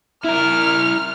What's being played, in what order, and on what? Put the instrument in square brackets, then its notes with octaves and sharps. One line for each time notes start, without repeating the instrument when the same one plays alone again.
[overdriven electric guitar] E4 A#4 [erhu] F6